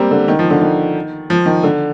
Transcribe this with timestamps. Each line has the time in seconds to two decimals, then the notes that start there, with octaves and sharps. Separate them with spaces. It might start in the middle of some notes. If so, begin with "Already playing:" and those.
Already playing: G3 A#3 C4
0.11 D3
0.28 D#3
0.39 F3
0.50 D3
0.61 D#3
1.30 F3
1.46 D#3
1.63 D3